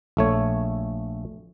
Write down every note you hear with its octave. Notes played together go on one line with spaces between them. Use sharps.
A#1 A3 C#5